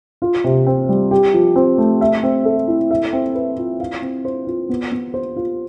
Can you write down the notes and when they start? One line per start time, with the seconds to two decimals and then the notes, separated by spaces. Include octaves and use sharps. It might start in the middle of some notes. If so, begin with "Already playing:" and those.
0.22 F4
0.44 C3
0.67 C4
0.89 G3
1.11 G4
1.34 F3
1.56 C4
1.78 A3
2.01 E5
2.23 C4
2.45 A4
2.68 E4
2.91 E5
3.13 C4
3.35 B4
3.58 F4
3.80 F5
4.02 C4
4.25 C5
4.47 F4
4.69 B3
4.92 B3
5.14 C5
5.36 F4